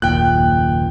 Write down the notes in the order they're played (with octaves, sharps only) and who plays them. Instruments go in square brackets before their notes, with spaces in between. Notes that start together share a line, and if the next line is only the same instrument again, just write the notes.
[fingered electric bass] F#1 D#2 A#2 [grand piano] G5 F#6